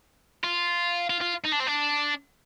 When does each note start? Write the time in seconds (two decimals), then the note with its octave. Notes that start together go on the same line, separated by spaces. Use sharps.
0.44 F4
1.10 F4
1.21 F4
1.44 D#4
1.52 D4
1.60 C4
1.67 D4